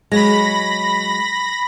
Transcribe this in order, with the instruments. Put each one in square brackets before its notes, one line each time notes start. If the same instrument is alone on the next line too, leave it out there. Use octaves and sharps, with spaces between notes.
[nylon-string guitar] F#3 G#3 [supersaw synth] B5 A#6